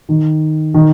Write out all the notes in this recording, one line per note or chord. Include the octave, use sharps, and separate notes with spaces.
D#3
D#3